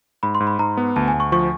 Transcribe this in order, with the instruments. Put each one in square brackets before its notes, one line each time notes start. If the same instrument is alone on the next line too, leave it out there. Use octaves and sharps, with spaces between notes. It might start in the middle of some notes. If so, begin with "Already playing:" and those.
[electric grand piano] G#2 [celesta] B5
[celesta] C6
[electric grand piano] G#2
[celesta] B5
[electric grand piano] G#2 [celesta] A#5
[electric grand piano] B3
[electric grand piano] D2 [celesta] A5
[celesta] G#5
[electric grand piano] D2
[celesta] C#6
[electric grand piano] F3 [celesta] C#6